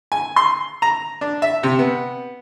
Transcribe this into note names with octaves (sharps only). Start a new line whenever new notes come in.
G#5
C6
A#5
D4
E5
C3
B3